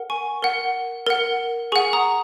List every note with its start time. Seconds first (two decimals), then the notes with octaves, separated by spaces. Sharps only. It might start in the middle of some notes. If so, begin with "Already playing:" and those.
Already playing: A#4 F#5
0.10 G#5 C#6
0.42 A#4 F#5
1.07 A#4 F#5
1.72 G#4 F#5 G#5 C#6
1.93 A#5 D#6